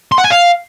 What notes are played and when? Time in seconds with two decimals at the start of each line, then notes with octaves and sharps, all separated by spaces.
0.12 C6
0.18 F#5
0.24 G#5
0.30 F5